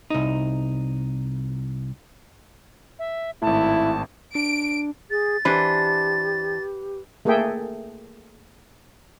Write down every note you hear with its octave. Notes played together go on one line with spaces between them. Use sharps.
C2 D#4
E5
G#1 A2 E4 A5
D4 D7
G#4 A6
E3 D4 G4 B4 C5
A3 A#3 G#4 A4 E5 G5